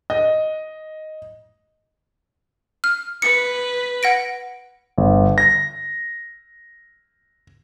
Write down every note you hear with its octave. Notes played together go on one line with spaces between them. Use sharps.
D#5
F6
B4 C#7
F#5 A#6 D7
G1
A#6